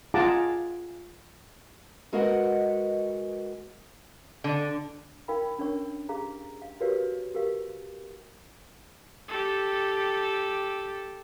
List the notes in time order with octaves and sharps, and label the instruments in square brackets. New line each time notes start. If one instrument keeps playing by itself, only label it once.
[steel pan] F4 G#4 F#5 A5 A#5 D6
[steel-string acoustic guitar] G#3 F#4 A#4 B4 D#5 F#5
[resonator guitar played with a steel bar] D3
[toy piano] D#4 A#4 F5 G5 B5
C#4 D4 A#4 C#5 C#6
G4 G#4 F5 A#5
F5
F#4 G4 A#4 B4 C#5 F5
G4 A#4 F5
[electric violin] G4 A4